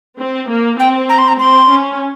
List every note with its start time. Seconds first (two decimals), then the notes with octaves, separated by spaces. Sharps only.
0.19 C4
0.49 A#3
0.79 C4 G5
1.09 A#5
1.18 C6
1.28 A#5
1.39 C4 C6
1.70 C#4